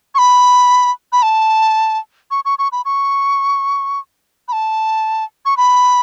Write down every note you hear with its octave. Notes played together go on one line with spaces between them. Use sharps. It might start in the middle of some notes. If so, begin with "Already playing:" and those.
C#6
B5
B5
A5
C#6
C#6
C#6
B5
C#6
B5
A5
C#6
B5